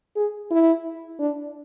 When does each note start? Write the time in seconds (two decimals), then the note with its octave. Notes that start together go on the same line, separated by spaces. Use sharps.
0.16 G#4
0.51 E4
1.19 D4